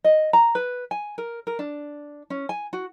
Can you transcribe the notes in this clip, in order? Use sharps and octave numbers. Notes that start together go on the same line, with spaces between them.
D#5
A#5
B4
G#5
A#4
A#4
D4
C#4
G#5
F#4